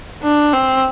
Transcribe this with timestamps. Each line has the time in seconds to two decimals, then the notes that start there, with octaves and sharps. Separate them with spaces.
0.23 D4
0.53 C4